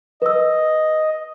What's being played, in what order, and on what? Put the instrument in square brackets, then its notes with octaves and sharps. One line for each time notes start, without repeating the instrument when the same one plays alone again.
[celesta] B4 E6 [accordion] D#5